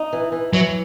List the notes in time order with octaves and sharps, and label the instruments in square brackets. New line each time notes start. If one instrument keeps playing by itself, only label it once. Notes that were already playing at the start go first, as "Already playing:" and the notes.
Already playing: [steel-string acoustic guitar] D#4
E3
E3
[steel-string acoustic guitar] E3 [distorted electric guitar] F#3